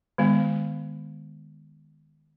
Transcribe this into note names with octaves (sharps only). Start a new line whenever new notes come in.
D#3 G#3 B3